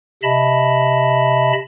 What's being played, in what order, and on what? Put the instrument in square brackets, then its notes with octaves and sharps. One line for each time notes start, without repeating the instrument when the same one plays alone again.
[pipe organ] C3 D#5 E5 A5 B5